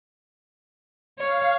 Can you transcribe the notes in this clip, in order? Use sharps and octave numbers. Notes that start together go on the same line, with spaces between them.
C#5 F5